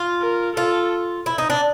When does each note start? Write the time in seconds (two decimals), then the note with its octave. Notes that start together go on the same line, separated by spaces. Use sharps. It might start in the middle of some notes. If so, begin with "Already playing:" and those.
Already playing: F4
0.21 A#4
0.56 F4 A4
1.26 E4
1.38 D#4
1.50 D4